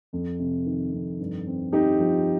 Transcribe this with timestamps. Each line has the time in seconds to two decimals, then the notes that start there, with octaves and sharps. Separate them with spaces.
0.13 F2
0.39 C3
0.66 D#3
0.93 F2
1.20 G2
1.47 C4
1.73 C4 D#4 G4
1.99 F3